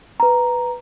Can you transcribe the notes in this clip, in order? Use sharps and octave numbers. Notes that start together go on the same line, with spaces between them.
B4 A#5